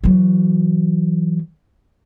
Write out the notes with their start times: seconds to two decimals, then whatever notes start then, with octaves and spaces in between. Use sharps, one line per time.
0.04 E3 F#3